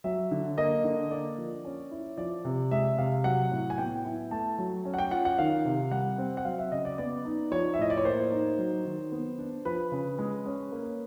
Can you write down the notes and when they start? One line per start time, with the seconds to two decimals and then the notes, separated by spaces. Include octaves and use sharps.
0.04 F#3 E5
0.31 D3
0.58 A#3 D#5
0.84 D3
1.11 A#3 D5
1.38 F3
1.65 C#4
1.91 E4
2.18 F3 D5
2.45 C3
2.71 G#3 E5
2.98 C3 F5
3.24 F#3 F#5
3.51 A2
3.70 G#5
3.78 B3 G5
4.05 E4
4.31 A3 A5
4.58 F#3
4.85 C#4
4.94 F#5
4.98 G5
5.11 F4 F#5
5.25 F#5
5.38 D#3 F5
5.65 C3
5.91 G3 F#5
6.18 C4
6.37 F#5
6.45 F#3 F5
6.58 E5
6.72 C#3 D#5
6.85 D5
6.98 B3 D5
7.25 D#4
7.51 F3 C#5
7.74 E5
7.79 A2 D#5
7.90 D5
7.97 C#5
8.05 A#3 C5
8.32 D#4
8.58 F#3
8.85 D#3
9.12 B3
9.38 D4
9.65 F3 B4
9.92 C#3
10.19 G#3
10.46 C#4
10.72 A#3